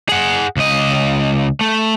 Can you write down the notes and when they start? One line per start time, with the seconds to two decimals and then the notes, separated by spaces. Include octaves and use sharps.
0.09 G#4 F#5
0.57 C#2 D#5
1.61 A3